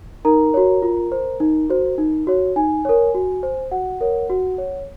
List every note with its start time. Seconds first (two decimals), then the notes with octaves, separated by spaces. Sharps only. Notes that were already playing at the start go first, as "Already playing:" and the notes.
0.25 D#4 A#4 A#5
0.54 F#4 C#5
0.82 F4
1.12 C5
1.40 D#4
1.70 F#4 C5
1.98 D#4
2.27 F#4 C#5
2.56 D#4 G#5
2.85 A#4 C#5
3.14 F#4
3.43 C5
3.71 F#4 F#5
4.01 A#4 C#5
4.30 F#4
4.58 C#5